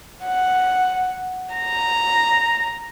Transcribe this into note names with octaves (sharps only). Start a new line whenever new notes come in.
F#5
A#5